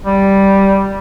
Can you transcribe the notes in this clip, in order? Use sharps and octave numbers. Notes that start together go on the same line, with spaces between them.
G3